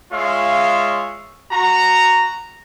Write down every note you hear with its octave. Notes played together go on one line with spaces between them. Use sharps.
G#3 F4 C#5 E5 F5
F#4 A#5